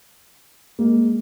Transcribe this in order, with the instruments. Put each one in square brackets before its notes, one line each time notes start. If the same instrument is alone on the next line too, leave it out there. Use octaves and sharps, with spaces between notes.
[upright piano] G#3 A#3